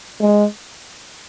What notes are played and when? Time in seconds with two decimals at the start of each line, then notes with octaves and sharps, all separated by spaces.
0.21 G#3